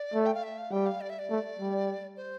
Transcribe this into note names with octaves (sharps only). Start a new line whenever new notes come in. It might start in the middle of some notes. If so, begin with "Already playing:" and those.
Already playing: D5
A3
G5
F5
E5
F5
G3 G5
F5
D5
E5
D5
A3
G3
C5